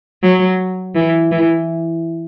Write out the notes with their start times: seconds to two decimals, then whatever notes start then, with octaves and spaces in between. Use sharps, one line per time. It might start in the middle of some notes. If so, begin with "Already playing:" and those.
0.23 F#3
0.95 E3
1.32 E3